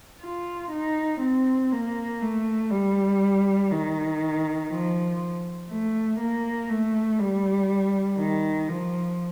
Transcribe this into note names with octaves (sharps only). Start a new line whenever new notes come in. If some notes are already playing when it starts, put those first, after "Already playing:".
F4
D#4
C4
A#3
A3
G3
D#3
F3
A3
A#3
A3
G3
D#3
F3